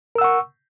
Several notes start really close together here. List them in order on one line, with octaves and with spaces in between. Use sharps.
A#4 E6 F#5 C#6